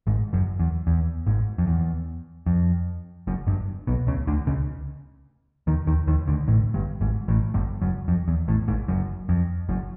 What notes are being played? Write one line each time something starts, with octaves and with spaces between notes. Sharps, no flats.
G#1 G#2
F#1 F#2
E2
E2
G#1 G#2
F2
E2
F2
F#1 F#2
G1 G2
B1 B2
C#2 C#3
D2 D3
C#2 C#3
D#2 D#3
D#2 D#3
D#2 D#3
D2 D3
A1 A2
G1 G2
G#1 G#2
A1 A2
G1 G2
F#1 F#2
F2
E2
A1 A2
G#1 G#2
F#1 F#2
F2
F#1 F#2